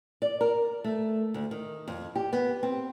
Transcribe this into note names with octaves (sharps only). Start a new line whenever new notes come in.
D5
A#4
A3
D2
D#3
F2
G4
B3
C4